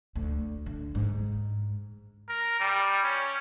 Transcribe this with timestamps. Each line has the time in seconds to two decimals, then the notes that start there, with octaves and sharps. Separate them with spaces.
0.15 D2
0.66 D3
0.95 G#2
2.29 A#4
2.60 G3
3.03 C#4